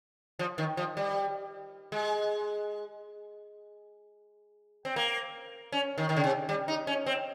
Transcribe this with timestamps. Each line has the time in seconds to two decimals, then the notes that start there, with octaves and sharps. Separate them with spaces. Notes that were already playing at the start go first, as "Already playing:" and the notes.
0.39 F3
0.58 D#3
0.77 F3
0.97 G3
1.92 G#3
4.85 C4
4.96 A#3
5.72 C#4
5.98 D#3
6.09 D#3
6.17 C#3
6.24 C3
6.49 G3
6.68 D#4
6.87 C#4
7.06 C4